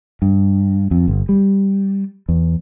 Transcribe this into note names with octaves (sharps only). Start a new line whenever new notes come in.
G2
F2
G1
G3
E2